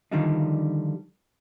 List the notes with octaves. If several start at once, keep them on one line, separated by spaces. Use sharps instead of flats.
D3 D#3 F3 G3 D4 D#4